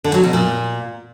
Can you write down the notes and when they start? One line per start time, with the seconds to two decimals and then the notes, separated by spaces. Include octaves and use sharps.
0.04 D3
0.14 F#3
0.24 B2
0.33 A#2